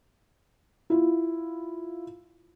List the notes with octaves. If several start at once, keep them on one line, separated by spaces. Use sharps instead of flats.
E4 F4